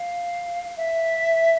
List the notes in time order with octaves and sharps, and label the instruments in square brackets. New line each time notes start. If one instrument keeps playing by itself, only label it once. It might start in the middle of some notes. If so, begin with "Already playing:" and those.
Already playing: [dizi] F5
E5